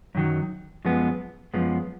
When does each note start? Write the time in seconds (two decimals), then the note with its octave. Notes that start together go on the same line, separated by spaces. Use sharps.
0.15 F#2 D#3 F#3
0.85 F#2 F3 G#3 B3
1.54 F#2 F3 G#3 B3